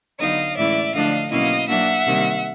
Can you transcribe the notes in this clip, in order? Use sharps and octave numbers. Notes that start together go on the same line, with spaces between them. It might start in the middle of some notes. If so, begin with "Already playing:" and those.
D3 F#3 B3 D#4 D#5 F5
A2 E3 G#3 C#4 E4 D5 E5
D3 F3 A3 D4 D#5 F5
B2 F#3 A#3 C#4 E4 D#5 F5
F#3 A#3 D4 E5 F#5
C3 D#3 G3 A#3